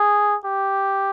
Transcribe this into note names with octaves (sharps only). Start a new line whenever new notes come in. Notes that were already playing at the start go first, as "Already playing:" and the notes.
Already playing: G#4
G4